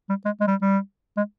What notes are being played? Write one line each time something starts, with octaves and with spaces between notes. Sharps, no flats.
G3
G#3
G#3
G3
G3
G#3